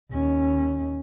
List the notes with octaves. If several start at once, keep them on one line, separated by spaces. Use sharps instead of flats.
D#2 C#4